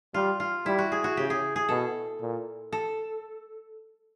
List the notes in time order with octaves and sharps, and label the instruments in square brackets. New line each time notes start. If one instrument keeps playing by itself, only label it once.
[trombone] G3 [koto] F4
[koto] F4
[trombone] G3 [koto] E4
[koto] F#4
G#4
F#4
[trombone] C#3 [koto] G4
[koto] G#4
G#4
[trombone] B2 [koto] A4
[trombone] A#2
[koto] A4